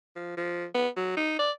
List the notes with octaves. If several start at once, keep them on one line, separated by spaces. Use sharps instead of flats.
F3
F3
B3
F#3
D#4
D5